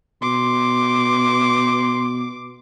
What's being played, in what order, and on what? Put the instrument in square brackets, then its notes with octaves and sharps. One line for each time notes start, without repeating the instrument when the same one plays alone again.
[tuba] B2 [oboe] C6 [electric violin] D6